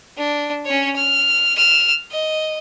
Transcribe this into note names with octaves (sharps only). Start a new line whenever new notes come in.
D4
C#4 C#5
F6
F6 E7
D#5